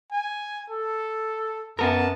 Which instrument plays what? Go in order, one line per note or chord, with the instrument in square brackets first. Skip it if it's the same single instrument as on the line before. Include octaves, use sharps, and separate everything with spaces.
[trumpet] G#5
A4
[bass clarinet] F#2 [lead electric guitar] B3 A#4 [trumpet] A5